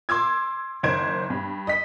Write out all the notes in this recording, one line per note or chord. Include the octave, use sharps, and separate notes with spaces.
C6 D6 E6 G#6
F#1 D#3 C5 G#6 D7
G2
D#5 B6